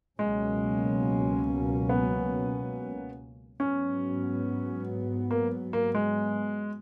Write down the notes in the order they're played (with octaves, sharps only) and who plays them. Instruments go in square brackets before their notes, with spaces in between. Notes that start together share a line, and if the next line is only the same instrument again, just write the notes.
[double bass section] C#2 B2 F#3 A#3 C#4 [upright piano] G#3
[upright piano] B3
[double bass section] G#2 F#3 B3 [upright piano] C#4
[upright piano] A#3
A#3
G#3